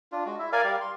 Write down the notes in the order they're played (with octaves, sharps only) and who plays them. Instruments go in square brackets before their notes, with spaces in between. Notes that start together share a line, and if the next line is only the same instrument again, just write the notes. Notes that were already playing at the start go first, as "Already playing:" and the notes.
[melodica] D4 F4
G#3 F#4
E4 E5
A#4 D5 F5 G#5
G3 G4 F5
C6